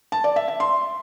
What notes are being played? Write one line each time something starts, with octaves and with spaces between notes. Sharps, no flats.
A5
D5
E5
E5
C6